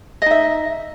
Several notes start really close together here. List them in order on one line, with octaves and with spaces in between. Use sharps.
D#5 D#4 E5